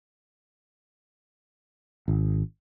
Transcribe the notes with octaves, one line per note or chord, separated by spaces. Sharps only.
G#1